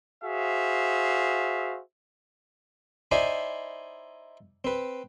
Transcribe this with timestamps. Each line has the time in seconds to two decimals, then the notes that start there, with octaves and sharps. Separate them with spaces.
0.24 F#4 G#4 C5 E5 F5
3.11 D#4 E4 C5 D5 G#5 B5
4.65 C4 B4